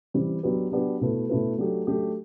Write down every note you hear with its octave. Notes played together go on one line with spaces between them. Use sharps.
E3 G3 C4
F#3 B3 D4 G4 B4
F#3 B3 D4 G4 B4
B2 A3 E4 B4
B2 A3 E4 B4
F#3 A3 D4 G4
F#3 A3 D4 G4